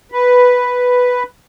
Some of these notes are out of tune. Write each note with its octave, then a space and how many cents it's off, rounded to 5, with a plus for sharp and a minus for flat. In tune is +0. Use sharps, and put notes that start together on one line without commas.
B4 +0